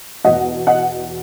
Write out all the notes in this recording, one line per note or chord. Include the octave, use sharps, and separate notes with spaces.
E2 B2 D#5 F#5
D#5 F#5